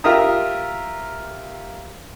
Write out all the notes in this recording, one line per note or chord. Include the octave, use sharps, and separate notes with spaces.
F4 G4 A#4 E5 A#5 D#6